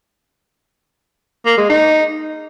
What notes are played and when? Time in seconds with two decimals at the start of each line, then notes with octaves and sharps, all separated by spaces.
1.46 A#3
1.58 G#3
1.69 D#4